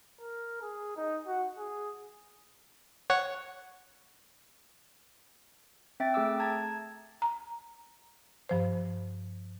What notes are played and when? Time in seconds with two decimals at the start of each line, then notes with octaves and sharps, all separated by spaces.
0.20 A#4
0.62 G#4
0.96 D#4
1.27 F#4
1.58 G#4
3.10 C#5 F#5
6.00 C4 E5 G5 A6
6.14 A3 G#4 G5 D6 E6
6.40 A5 A#5 G#6 A6
7.22 A#5
8.49 G2 F3 C5